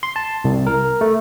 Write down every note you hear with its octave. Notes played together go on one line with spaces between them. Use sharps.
C6
A5
C2
A#4
A3